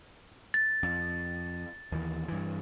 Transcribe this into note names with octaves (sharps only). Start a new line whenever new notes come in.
A6
F2
D#2 E3
G2 E3